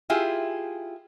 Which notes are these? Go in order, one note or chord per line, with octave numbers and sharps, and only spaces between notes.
E4 F4 G4 G#4